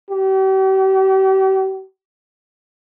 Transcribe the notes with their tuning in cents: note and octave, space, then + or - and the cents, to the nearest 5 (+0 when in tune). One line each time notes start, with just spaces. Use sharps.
G4 -40